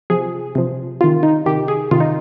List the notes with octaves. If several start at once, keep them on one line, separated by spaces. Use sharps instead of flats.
C3 F3 G#4
C3 F3
C3 D#3 F4
D#4
C3 D#3 G4
G#4
C3 D#3 F4
D#4